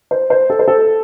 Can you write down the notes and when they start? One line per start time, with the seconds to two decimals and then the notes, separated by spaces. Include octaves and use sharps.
0.11 C5
0.30 C5
0.50 A4
0.59 C5
0.68 A4